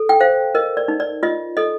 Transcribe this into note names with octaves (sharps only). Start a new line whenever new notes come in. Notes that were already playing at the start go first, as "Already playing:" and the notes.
Already playing: A4
G5
C5 F5
A#4 D#5
D5
D#4
D5
F4 D#5
A4 D#5